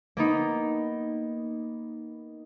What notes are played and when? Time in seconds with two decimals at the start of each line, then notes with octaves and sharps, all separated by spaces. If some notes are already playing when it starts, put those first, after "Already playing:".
0.17 A#3 B3 D#4